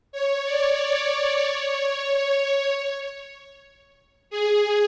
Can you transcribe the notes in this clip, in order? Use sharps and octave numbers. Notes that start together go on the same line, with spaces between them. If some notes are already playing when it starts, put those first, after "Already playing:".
C#5
D5
D5
C#5
G#4